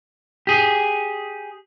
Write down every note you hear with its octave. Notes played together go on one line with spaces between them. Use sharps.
G4 G#4